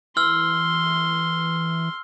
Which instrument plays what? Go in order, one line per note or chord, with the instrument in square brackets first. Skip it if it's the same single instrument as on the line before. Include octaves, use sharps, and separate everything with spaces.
[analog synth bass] E3 [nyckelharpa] C6 [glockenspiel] E6 F6 F#7